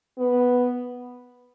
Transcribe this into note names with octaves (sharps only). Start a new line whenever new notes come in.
B3